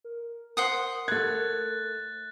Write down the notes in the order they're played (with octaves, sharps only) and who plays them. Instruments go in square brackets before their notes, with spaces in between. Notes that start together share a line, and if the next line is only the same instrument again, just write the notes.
[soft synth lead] A#4
[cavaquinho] C5 F#5 D#6
[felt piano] A3 G#6 [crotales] F#6 A6